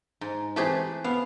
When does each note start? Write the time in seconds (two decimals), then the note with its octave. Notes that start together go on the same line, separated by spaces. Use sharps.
0.21 G#2
0.56 E3 A3 C4 G4 G#4
1.04 B3 F5